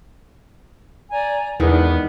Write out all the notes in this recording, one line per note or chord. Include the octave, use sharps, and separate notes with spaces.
D5 G#5 A#5
E2 D#3 E3 G#3 B3 D4